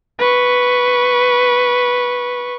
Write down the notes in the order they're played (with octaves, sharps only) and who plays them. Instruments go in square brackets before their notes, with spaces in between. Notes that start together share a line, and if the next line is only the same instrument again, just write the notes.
[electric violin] B4 C#6